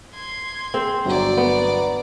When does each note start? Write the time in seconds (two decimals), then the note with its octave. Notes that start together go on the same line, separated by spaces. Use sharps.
0.14 C6 G#6
0.74 C4 G#4
1.05 G1 F#3 D5 A#5
1.37 B3